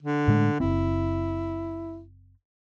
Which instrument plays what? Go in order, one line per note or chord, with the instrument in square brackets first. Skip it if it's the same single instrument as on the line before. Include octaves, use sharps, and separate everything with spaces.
[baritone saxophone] D3
[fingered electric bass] A2 G#3 A3
[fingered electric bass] F#1 C4 [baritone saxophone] E4